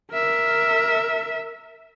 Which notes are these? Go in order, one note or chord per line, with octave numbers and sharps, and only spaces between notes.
A#4 E5